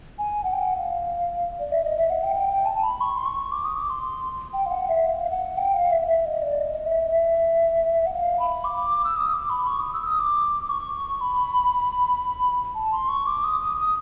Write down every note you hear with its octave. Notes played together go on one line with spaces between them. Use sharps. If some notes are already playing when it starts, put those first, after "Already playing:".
G#5
F#5
G5
F#5
F5
D5
E5
D#5
E5
F#5
G5
G5
G5
A5
B5
C#6
C6
C#6
D6
D#6
D6
C6
G5
F5
F#5
E5
F5
F5
F#5
G5
F5
E5
E5
D#5
D5
D#5
D#5
E5
E5
F#5
F5
B5
D6
E6
D#6
D6
B5
C#6
D#6
E6
D#6
D6
C#6
B5
A5
C6
C#6
D6
D#6
D#6
D#6